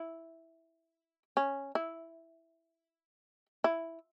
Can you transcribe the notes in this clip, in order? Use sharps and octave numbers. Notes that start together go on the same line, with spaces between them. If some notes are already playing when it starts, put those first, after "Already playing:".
Already playing: E4
C#4
E4
E4